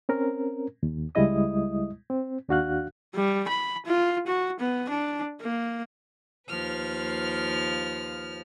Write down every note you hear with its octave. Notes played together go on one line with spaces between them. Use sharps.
C4 C#4 A#4
D#2
C#2 G3 G#3 E4 D#5 D#6
C4
D#2 D4 F#4 F5 F#6
G3
B5
F4
F#4
B3
D4
A#3
D#2 F3 B4 F6